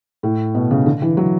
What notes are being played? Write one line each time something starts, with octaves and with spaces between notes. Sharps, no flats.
A2
B2
C#3
D3
E3
F#3